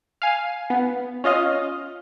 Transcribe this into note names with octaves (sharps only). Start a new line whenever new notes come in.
F5 G#5
B3
C#4 F4 D#5 F5